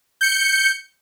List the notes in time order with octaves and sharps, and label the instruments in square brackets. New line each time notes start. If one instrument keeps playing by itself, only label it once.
[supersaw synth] G6 C#7